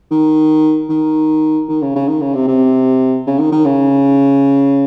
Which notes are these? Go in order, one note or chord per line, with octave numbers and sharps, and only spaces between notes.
D#3
D#3
D#3
C#3
C#3
D#3
C#3
C3
C3
C#3
D#3
D#3
C#3